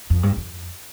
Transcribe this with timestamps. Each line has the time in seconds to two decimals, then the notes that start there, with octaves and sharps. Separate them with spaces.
0.10 F2
0.23 G2
0.37 F2